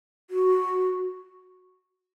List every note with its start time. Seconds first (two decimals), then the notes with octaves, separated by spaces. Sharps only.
0.30 F#4